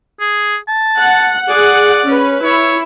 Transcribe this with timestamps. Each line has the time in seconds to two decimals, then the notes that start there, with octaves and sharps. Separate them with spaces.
0.20 G#4
0.68 A5
0.99 F#5
1.49 G#4 D5 F#5
2.06 C#4 B4
2.44 E4 C#5